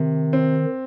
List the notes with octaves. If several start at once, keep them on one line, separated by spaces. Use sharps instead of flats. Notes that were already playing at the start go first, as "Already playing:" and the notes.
Already playing: C3 D#3
C4